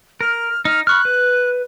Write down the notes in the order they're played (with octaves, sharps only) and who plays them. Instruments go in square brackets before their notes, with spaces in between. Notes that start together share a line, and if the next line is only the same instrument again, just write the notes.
[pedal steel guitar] A#4 [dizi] F6
[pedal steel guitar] D#4 [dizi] F6
[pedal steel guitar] B5 C#6 F6 [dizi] F#6
[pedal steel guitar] B4